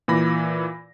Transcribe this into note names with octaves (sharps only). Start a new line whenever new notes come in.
A#2 E3 B5 A#6